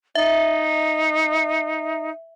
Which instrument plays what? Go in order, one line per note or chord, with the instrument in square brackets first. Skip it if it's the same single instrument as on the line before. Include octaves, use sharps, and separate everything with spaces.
[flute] D#4 [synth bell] E5